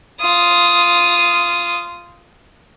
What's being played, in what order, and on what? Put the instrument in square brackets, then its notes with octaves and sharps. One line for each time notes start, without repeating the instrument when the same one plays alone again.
[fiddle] F4 D#6